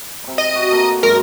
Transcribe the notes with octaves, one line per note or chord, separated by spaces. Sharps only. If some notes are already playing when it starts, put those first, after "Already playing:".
C3 B5
D#5
F#4
A#3 A4 A#4
F#2 G#3 A#4